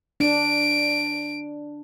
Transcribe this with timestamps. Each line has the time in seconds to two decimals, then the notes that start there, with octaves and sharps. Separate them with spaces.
0.20 D4 D7